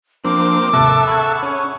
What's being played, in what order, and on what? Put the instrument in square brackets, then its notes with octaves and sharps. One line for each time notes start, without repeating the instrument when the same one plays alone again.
[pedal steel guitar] F3 D4 [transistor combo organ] A#3 C4 [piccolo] D6
[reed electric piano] D#2 G#2 C3 [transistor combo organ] A4 E5 [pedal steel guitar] A#4 F#5 A5
[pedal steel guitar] G#4 F#5 [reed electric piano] B5 E6 G#6 [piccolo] C#6
[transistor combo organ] C#4